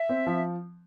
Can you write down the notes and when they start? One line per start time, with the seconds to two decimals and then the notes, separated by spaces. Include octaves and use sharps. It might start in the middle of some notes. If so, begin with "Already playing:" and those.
Already playing: E5
0.09 C4
0.26 F3